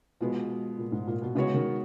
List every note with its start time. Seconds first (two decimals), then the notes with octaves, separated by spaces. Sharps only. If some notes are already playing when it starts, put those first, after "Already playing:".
0.21 B2 F3 G#3 B3
0.78 A#2
0.92 G#2
1.07 A#2
1.22 B2
1.35 C#3 G#3 B3 F#4 C#5
1.54 D#3